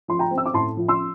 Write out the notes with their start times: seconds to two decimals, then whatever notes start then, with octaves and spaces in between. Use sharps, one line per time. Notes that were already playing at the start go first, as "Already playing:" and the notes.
0.08 F3 C6
0.19 G5 A#5
0.31 C4
0.38 E6
0.46 D6
0.53 A2 A5 C6
0.77 F3
0.88 C6 E6